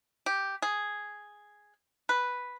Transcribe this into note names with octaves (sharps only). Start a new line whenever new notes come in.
G4
G#4
B4